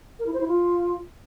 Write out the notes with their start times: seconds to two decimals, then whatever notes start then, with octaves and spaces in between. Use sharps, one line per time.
0.19 A#4
0.26 E4
0.34 C5
0.41 E4
0.48 F4